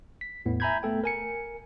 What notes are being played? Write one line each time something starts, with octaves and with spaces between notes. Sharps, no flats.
B6
E2 A2 B3
E5 G#5 A#5 B5 G6 G#6
A3 B3 A4 G5
A#4 G#5 C#7